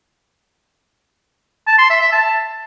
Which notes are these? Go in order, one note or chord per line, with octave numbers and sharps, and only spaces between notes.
A5
C6
E5
E5
A5